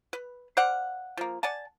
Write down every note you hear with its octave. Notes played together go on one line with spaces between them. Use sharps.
B4
C5 D5 F5 F#5
F3 A#3
D5 F#5 G#5 A5